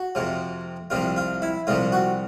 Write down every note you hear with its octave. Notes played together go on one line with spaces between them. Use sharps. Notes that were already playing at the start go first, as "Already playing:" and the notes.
Already playing: F#4
F2 C3 F3
C2 C3 F3 F4
F4
E4
C2 C3 F3 F4
F#4